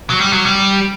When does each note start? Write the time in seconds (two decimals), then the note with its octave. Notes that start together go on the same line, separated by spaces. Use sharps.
0.10 F#3
0.20 G3
0.33 F#3
0.46 G3